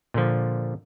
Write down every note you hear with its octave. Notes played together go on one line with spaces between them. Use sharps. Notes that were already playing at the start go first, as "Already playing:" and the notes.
A#2 D3 F3